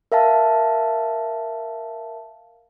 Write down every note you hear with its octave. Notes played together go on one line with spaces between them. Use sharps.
A#4 E5 F5 A5